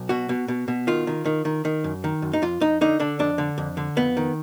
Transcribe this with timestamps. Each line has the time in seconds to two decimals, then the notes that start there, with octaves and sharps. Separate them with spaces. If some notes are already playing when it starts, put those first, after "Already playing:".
Already playing: B1
0.09 B2 F#4
0.29 B2
0.48 B2
0.68 B2
0.87 D#3 F4
1.07 D#3
1.25 D#3
1.45 D#3
1.65 D#3
1.84 F#2
2.04 D#3
2.22 F#2
2.33 D#4
2.42 F2 F4
2.61 F2 D#4
2.81 D3 D#4
3.00 D3 D4
3.19 F2 D4
3.38 D3
3.58 F2
3.77 D3
3.96 F2 B3
4.17 D#3